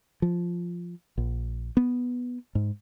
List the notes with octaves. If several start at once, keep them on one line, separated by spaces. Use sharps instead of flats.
F3
A#1
B3
G#2